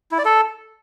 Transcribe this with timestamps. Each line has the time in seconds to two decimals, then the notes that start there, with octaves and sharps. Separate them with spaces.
0.12 E4
0.18 D5
0.25 A4